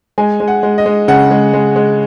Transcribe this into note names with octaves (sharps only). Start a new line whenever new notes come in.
G#3 G#5
G#3
F#5
G#3
D#5
G#3
C#3 F#5
G#3
G#3
G#3